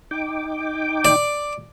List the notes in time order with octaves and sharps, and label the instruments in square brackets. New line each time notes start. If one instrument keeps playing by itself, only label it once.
[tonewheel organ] D#4 G5 D6
[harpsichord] D5